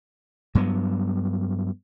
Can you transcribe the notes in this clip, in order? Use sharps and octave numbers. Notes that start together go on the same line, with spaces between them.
G2 F#3 B3